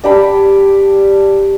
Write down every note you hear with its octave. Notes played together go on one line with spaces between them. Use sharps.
D4 G4 B5